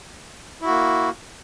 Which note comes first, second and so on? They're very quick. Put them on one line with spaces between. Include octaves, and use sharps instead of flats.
E4 F#4 A#3